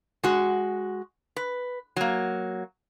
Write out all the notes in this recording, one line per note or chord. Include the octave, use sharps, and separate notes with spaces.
G#3 F#4
B4
F#3 A#3